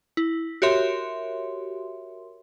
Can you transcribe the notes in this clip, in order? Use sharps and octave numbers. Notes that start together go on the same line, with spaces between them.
E4
F#4 G4 A#4 C#5 E5 C6